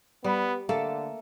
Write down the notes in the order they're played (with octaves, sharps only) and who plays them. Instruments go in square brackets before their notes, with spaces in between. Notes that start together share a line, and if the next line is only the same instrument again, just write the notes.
[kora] G3 [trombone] B3
[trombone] D3 [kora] A3 A#3 A4